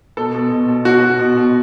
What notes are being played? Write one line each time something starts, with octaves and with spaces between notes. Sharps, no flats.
B2 A4
B2
B2
B2
B2 F#4
B2
B2
B2